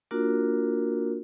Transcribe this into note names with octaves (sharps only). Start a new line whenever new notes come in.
A#3 D4 F4 F#4 A#4